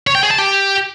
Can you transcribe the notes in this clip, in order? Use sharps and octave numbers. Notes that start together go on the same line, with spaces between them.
C#5
G5
G#4
A5
G4